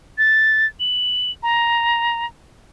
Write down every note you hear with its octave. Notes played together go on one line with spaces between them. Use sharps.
A6
F#7
A#5